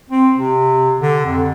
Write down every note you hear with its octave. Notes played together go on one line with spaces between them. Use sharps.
C4
C3
D3
F2